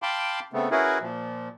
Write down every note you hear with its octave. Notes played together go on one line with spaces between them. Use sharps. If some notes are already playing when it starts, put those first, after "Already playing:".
F5 G5 A5 B5 C6 D6
C#3 A3 B3 C4
C#4 E4 F#4 G#4 A#4 B4
A#2 F3